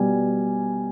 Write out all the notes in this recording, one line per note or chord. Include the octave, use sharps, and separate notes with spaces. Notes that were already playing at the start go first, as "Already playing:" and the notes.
Already playing: B2 G3 G#5